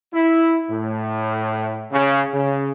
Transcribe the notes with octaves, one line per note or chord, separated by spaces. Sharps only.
E4
A2
C#3
C#3